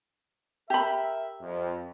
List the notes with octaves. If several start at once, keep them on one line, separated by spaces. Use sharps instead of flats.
G4 A#4 E5 B5
F2